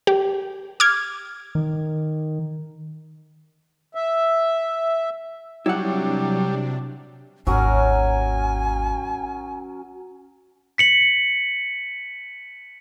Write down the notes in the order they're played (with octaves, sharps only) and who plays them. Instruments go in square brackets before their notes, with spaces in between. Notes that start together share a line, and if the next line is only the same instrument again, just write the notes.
[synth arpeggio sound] G4
D6 F6 G#6
[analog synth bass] D#3
[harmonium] E5
[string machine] C3 D4 [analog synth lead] F#3 [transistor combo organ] G3 [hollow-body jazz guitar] E4 F#5
[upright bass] G#1 D#2 [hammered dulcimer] F#3 C#4 A#4 [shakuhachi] G#5
[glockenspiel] B6 C#7 F#7